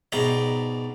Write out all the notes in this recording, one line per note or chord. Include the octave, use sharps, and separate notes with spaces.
G#2 B2 D5 G5 A#5